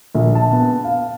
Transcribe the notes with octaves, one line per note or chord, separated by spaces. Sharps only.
A#1
A5
B3
F5